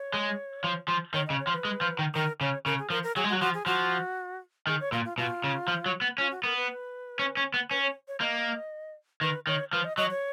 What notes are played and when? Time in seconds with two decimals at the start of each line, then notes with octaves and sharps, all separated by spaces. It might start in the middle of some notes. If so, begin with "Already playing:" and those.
Already playing: C#5
0.14 G#3
0.64 F3
0.88 F3
1.14 D#3 C#5
1.26 C#3 D#5
1.40 C#5
1.47 F3
1.52 B4
1.65 G#3
1.81 F3
1.99 D#3
2.15 D#3 A#4
2.41 C#3 C#5
2.65 C#3 A#4
2.79 G#4
2.90 F3 A#4
3.03 A#4
3.16 F#3 G#4
3.24 G#3
3.29 F#4
3.33 F#3
3.41 F3 F#4
3.54 G#4
3.66 F3 F#4
4.67 D#3 G#4
4.80 C#5
4.92 A#2 F4
5.05 F4
5.18 B2 F4
5.44 C#3
5.68 F3
5.86 F#3
6.02 B3
6.18 C#4 F4
6.31 F#4
6.44 B3 A#4
6.57 B4
7.19 C#4
7.37 C#4
7.54 B3
7.70 C#4 B4
7.83 C#5
8.08 C#5
8.21 A#3 D#5
9.21 D#3 B4
9.47 D#3 C#5
9.73 F3 B4
9.84 D#5
9.97 F#3 D#5
10.10 C#5